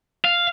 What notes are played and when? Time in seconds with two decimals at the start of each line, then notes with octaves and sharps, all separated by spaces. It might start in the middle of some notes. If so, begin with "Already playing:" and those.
0.24 F5